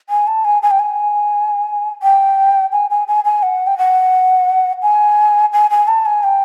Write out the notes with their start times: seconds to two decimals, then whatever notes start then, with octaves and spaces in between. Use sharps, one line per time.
0.10 G#5
0.27 A5
0.45 G#5
0.62 G#5
0.71 G5
0.79 G#5
2.03 G5
2.72 G#5
2.90 G#5
3.08 G#5
3.25 G#5
3.43 F#5
3.67 G5
3.78 F#5
4.82 G#5
5.53 G#5
5.71 G#5
5.88 A5
6.06 G#5
6.23 G5